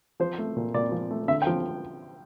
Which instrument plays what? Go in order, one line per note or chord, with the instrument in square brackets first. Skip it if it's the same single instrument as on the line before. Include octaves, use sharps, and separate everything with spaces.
[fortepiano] F3 C5
A3
A#2
A#2 D5
F3
A3
D3 E5
G5
F3